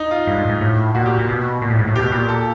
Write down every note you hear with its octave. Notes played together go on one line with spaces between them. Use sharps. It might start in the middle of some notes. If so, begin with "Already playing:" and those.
Already playing: D#4
F4
G2
G#2
G#2
A2
A#2 F#4
G4
A#2
B2
A#2
A2
G#2
A2
B2 G4
A#2 G4
A4